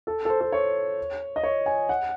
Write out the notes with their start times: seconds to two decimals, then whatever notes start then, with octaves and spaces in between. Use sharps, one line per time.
0.07 A4
0.25 A4
0.30 C5
0.41 A4
0.52 C#5
1.36 D#5
1.43 C#5
1.66 G#5
1.89 F#5